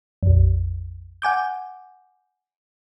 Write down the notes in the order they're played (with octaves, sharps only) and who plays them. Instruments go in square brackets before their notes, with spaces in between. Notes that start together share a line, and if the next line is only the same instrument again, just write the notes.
[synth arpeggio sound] A#1 F2
F#5 G#5 D6 G6